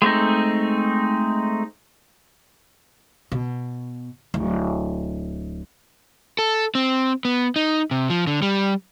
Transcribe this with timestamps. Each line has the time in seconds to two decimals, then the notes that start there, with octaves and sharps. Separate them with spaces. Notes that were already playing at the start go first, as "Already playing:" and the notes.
0.02 G#3 A3 C4 D#4
3.32 B2
4.34 D1
6.39 A4
6.75 C4
7.25 B3
7.56 D#4
7.91 C3
8.10 F3
8.27 D3
8.42 G3